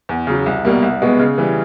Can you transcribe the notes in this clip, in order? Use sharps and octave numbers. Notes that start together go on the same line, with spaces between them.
E2
C#3 F#3
C2
B2 G3 A#3
C2
B2 G#3 B3
C#3
E3 G3